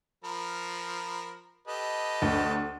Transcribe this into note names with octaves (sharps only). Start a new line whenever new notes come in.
F3 A#4 B5
G4 A4 B4 D#5
D2